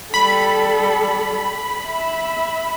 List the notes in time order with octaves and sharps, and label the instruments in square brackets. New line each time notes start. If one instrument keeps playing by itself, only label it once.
[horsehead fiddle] G3 A4 [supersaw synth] B5
[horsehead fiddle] E5